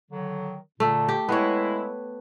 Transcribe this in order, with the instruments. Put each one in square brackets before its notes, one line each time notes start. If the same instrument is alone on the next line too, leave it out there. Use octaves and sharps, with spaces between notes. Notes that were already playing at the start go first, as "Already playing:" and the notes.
[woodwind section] D3 D#3 F#3
[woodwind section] A#2 D3 [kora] A3
[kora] G4
[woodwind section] G#3 E4 [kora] B3 C#5